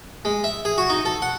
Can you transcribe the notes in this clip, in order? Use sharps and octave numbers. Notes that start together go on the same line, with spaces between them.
G#3
E5
G#4
F#4
D#4
A4
F#5